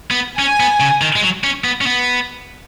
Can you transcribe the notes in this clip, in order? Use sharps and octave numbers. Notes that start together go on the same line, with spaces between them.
B3
C#4 G#5
B3
C#3
D#3
G#3
F#3
C#4
B3
C#4
B3